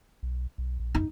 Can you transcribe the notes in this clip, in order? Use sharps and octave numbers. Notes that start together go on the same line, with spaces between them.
B1
B1
A#1
F#2 D#4